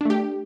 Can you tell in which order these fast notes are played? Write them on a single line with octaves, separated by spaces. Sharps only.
D4 A3 G4